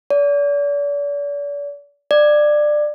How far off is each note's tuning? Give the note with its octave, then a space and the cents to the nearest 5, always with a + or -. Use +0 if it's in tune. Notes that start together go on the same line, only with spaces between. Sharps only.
D5 -40
D5 +20